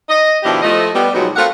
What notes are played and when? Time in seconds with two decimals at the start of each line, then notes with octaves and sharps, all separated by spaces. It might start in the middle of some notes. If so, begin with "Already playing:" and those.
0.09 D#5
0.43 B2 D#3 F3 D4 E4 G4
0.63 F3 A3 D#5
0.95 G3 B3
1.14 B2 F3 F#3 G#3 D#4
1.36 A3 C4 F4 A#4 F5 F#5